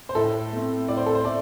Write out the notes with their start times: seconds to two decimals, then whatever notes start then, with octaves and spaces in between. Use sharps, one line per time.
0.09 C5
0.15 A2 A4
0.52 A3 C4
0.88 A2 D5
0.97 C5
1.06 A4
1.15 C5
1.25 A3 D5